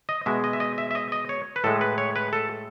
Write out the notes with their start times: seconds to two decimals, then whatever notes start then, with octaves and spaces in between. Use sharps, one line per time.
0.09 D#5
0.26 B2 G#3 E5
0.44 D#5
0.53 E5
0.60 D#5
0.78 E5
0.91 E5
0.95 D#5
1.12 D#5
1.29 C#5
1.56 B4
1.64 A2 G#3 A4
1.81 B4
1.98 C#5
2.16 B4
2.33 A4